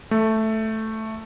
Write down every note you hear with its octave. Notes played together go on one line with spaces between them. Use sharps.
A3